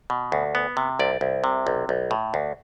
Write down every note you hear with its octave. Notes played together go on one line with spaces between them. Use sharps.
B2
D2
B3
C3
C2 D5
C2
C3
B1
B1
A2
D2